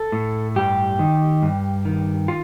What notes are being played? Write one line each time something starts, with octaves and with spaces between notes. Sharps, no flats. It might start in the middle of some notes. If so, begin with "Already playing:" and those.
Already playing: A4
A2
G2 G4
D#3
G2
D#3
F4